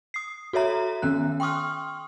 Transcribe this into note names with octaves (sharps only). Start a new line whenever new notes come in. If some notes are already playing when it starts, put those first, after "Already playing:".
D#6 C7
F#4 A4 C#5 E5 A#5
D#3 B3 C#4 F#6
G5 C6 C#6 D#6 F6